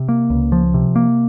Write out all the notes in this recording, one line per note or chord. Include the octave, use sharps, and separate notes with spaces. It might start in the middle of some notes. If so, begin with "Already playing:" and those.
Already playing: C3
A#3
C#2
F3
C3
A#3